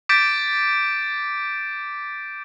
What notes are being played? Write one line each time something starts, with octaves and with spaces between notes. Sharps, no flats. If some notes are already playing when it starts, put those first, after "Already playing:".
D6 G6 A6 B6 D7